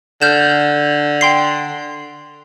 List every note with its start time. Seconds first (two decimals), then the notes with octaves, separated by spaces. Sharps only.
0.22 D3 F6 G6 E7
1.21 G5 C6 C7